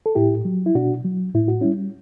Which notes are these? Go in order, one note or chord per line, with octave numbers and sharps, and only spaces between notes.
A4
A2 E4 G4
F#3
E4
B2 D4 F#4
F#3
A2 E4
F#4
G3 C#4 E4